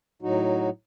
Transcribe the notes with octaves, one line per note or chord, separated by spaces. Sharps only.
A2 F#3 D#4 F#4